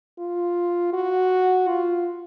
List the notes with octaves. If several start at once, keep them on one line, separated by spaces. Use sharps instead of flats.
F4
F#4
F4